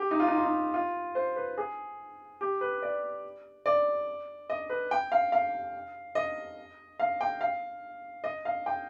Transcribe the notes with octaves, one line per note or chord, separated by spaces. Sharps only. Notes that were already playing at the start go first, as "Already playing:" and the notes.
Already playing: G4
D#4
F4
D#4
F4
D#4
F4
C5
B4
G#4
G4
B4
D5
D5
D#5
B4
G5
F5
F5
D#5
F5
G5
F5
D#5
F5
G5